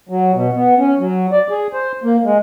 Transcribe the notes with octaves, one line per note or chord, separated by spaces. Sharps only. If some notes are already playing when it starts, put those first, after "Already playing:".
F#3
B2
B3
C#4
F#3
D5
G#4
C5
A#3
G#3